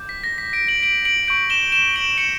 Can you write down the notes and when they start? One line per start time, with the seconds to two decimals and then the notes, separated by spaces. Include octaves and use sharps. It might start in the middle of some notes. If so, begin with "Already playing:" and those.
Already playing: D6 G6
0.09 B6
0.24 A#6
0.38 B6
0.53 B6 D7
0.68 D7 F#7
0.83 D7 F#7
1.05 D7 F#7
1.27 C#6 G6 D7 F#7
1.50 E7 G7
1.72 E7 G7
1.96 D7 F#7
2.17 C#7 E7